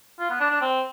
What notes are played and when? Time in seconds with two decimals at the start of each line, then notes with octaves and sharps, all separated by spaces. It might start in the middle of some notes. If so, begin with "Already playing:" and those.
0.19 F4
0.30 B3
0.40 D4
0.51 D4
0.61 C4